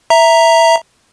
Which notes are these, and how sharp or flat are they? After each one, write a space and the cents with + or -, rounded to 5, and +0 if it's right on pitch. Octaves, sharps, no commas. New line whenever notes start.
E5 +0 A#5 +0